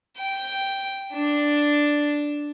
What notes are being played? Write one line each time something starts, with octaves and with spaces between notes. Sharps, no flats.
G5
D4